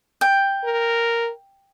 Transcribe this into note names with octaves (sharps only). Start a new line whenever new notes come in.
G5
A#4